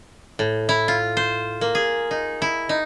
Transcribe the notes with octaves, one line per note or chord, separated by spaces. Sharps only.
A2
E4
F4
C5
A#3
G#4
D#4
E4
D#4